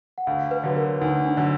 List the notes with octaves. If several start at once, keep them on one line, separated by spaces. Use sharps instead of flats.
F#5
D2 F5
B4
D3 F#3
A#4
D2 D#4
D4
D3 F#3